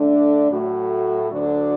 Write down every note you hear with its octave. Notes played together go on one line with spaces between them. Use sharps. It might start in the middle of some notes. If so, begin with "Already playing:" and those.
Already playing: D3 A3 D4
A2 F#3 A3 F#4
D2 D3 F#3 D4 F#4